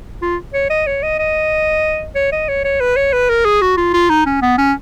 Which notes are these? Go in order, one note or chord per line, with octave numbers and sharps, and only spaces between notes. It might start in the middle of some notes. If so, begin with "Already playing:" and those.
F4
C#5
D#5
C#5
D#5
D#5
C#5
D#5
C#5
C#5
B4
C#5
B4
A#4
G#4
F#4
F4
F4
D#4
C#4
B3
C#4